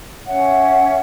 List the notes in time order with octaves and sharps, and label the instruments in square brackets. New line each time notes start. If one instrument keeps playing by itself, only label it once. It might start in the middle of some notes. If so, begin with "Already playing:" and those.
[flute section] C#4 C#5 E5 F#5